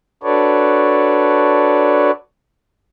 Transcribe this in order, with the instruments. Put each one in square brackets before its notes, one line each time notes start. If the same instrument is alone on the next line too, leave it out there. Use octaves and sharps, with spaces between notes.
[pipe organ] D4 F#4 A4 B4 C#5 D5